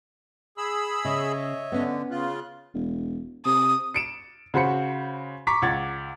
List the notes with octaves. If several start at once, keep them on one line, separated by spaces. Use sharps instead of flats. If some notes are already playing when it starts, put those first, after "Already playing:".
G#4 B5 E6
C#3 C#5 D#5 E5
D3 B3 C#4
C#3 F4 F#6
E1
C3 D#6
C#7 D7 E7
C#3 F#4 C5 B5 C#7
A#5 C#6 D6 B6
C#2 F#5 G#6 A6